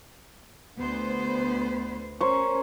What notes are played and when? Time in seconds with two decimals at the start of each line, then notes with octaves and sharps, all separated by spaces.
0.78 D2 B3 C5
2.21 C#4 A#4 C5 C#5